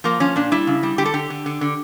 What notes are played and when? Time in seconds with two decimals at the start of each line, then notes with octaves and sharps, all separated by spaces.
0.04 F3 A#3
0.20 F3 C#4
0.36 A#2 D4
0.52 G3 E4
0.67 C#3
0.83 G3
0.98 D3 G4
1.06 A4
1.14 D3 G4
1.30 D3
1.46 D3
1.61 D3